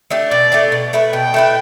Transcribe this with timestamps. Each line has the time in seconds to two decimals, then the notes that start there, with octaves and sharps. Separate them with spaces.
0.10 A3 D4 G4
0.30 B2 D5
0.52 A3 D4 G4
0.72 B2
0.93 A3 E4 B4
1.13 B2 G5
1.34 A3 E4 B4